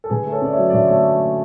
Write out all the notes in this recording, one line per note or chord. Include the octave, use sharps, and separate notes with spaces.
A4
D3 G#4 B4
A3
A4 C#5
C#4 D5
C#5 E5
F#3
D5
D3 C#5 E5
C#5
A3